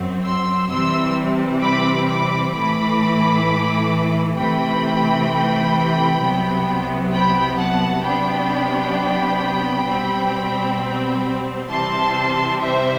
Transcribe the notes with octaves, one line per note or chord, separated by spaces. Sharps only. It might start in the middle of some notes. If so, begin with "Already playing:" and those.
Already playing: F#2 F#3 C4
C6 E6
C3 E3 G3 C4 C6 E6
B5 D6
B5 D6
A2 E3 A3 B5 D6
C3 E3 A3 C4 G5 B5
C2 C3 F#3 B3
G5 B5
F#5 A5
C3 F#3 B3 D4 G5 B5
B2 G3 C4
C3 E3 G3 C4 A5 C6
C5 E5